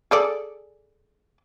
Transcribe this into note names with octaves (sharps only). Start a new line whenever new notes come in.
G#4 A4 D5